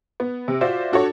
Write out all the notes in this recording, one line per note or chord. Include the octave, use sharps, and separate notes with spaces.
B3
C3
F4 F#4 C5 D5 E5
D4 F#4 A4 C#5